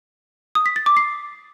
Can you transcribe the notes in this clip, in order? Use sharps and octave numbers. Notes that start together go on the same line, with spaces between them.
D#6
B6
A6
D6
C7